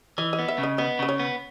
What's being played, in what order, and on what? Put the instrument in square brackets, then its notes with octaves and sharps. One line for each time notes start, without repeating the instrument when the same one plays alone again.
[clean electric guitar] E3 [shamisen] D#5
[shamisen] D#5
[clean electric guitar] B3
[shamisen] E5
[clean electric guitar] C#3
[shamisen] D#5
[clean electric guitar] B3 [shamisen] D#5
[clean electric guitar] C#3 [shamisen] D#5
[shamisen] C#5
[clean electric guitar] B3